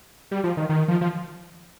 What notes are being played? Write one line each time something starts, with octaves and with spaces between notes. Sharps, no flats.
G3
F3
D#3
D#3
F3
F3